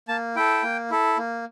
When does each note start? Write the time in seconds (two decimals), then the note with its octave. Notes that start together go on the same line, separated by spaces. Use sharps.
0.08 A#3 A5
0.36 E4 A4 G5
0.63 A#3
0.90 E4 A4
1.18 A#3